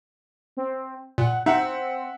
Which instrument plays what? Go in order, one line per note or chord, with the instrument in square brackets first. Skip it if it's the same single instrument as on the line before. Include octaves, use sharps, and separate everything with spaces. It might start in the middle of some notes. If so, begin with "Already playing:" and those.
[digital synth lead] C4
[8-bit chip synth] A#2 [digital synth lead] F#5
[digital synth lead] C4 [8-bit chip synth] D#4 [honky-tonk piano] E5 F#5